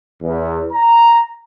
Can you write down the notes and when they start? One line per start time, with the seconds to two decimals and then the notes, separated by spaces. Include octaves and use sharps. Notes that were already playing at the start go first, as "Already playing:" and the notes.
0.22 E2
0.72 A#5